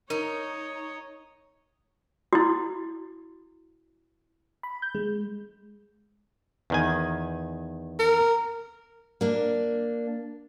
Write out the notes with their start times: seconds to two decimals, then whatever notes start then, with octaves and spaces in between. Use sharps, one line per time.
0.10 D#4 A#4 C#5 D#5
2.33 E4 F#4
4.63 B5
4.82 G6
4.95 G#3
6.70 E2 D#3 G#5
7.99 A#4
9.21 A#3 D4